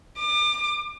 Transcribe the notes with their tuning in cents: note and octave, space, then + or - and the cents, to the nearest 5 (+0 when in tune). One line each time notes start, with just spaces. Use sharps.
D6 +35